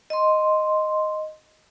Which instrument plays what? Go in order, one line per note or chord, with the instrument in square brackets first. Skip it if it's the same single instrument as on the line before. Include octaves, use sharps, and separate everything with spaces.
[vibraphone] D#5 C6